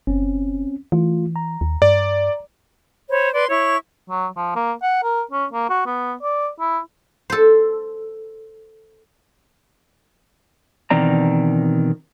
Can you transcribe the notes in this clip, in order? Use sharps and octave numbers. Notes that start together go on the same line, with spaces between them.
F#1 C4 C#4
E3 A3 F4
A#5
D#2
G2 D5
C5 C#5 B5
B4 D5 C6
E4 C#5 C#6
F#3
F3
A#3
F#5
A#4
C#4
A#3
F#4
B3
D5
E4
A4 C5
B2 D#3 E3 C4 D5 A#5